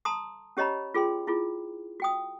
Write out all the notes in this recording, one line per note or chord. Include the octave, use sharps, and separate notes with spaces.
A5 A#5 C6 D#6
C#4 G4 C#5 D#5 A#5 B5
F4 G#4 G5 C6
E4 F4 G#4
F#4 G5 D#6